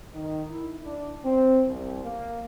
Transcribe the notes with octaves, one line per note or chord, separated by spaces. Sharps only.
D#3
E4
D4
C4
C2
A#3